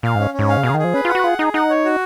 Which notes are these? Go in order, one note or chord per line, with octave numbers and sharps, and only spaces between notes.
A#2 F5
G#2 C#4
C#4
G#2
F5
C#3
B2 G#4
C#3
D#3
G#4
F3
C#4 B4
F4
F#5
F#4
F4 G#4
D#4 G#4
D#4 F#5
C#5
F#4